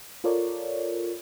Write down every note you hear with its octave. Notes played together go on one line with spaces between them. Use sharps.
F4 A4 A#4 C#5 D5